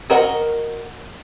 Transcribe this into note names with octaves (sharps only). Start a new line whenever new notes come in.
F#4 A#4 D#5 F#5